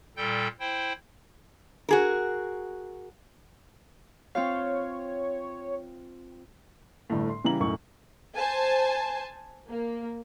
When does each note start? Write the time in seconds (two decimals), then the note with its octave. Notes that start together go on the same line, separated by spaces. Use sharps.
0.17 A#2 G3 A4 G5 G6
0.60 E4 C5 G5
1.89 F#4 G#4 A#4
4.35 C4 F4 C#5 F5
7.10 G1 A2
7.29 C6
7.44 C#3 E3 G3 E4 A#5 F#7
7.60 B1 F#2 A2 C#6
8.37 C5 G#5 A5
9.69 A#3